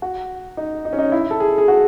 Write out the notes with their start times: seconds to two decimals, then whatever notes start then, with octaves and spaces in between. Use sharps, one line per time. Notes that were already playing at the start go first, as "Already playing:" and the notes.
0.02 F#4
0.57 D#4
0.85 D#4
0.93 C#4
0.99 D#4
1.12 E4
1.31 A4
1.40 G#4
1.58 G#4
1.68 F#4